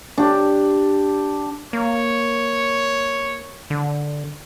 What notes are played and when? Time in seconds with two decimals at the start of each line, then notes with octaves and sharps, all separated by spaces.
0.18 D4 G4
1.73 A#3 C#5
3.70 D3